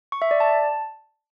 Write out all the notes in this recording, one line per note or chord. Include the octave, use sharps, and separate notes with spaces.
C#6
E5
D5
A5